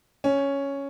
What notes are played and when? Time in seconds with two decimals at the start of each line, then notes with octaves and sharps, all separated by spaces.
0.24 C#4